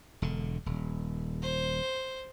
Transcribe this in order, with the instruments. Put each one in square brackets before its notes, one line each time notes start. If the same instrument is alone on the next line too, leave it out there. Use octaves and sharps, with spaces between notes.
[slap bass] E1 D3
D#1
[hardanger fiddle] C5